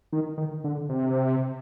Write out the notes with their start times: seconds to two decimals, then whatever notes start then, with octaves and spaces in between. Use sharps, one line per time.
0.12 D#3
0.37 D#3
0.64 D3
0.89 C3